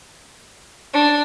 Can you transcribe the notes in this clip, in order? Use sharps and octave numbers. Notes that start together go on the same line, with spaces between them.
D4